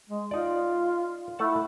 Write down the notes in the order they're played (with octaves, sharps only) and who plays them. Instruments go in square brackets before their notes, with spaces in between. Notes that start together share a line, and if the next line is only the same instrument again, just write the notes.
[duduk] G#3
[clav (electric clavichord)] D#4 D5 [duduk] F4
[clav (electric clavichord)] A3 F#5 A5 [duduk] E4